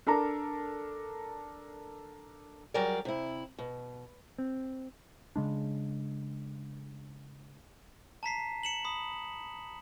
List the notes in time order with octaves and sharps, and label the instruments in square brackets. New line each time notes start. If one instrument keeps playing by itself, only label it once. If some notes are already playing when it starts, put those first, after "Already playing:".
[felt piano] D4 A4 A#4 A#5
[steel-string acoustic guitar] F#3 G3 G4 G#4 A#4 D5
C3 E4
B2
[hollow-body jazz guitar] C4
[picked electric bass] C#3 G#3 D4
[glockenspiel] A5 A#5 B6 C7
C#7 E7 F#7
B5 D#6